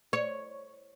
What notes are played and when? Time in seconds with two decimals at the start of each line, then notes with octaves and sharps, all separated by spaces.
0.13 C#5